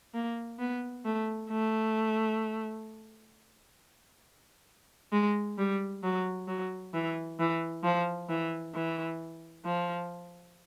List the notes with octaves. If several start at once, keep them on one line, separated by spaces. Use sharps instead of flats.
A#3
B3
A3
A3
G#3
G3
F#3
F#3
E3
E3
F3
E3
E3
F3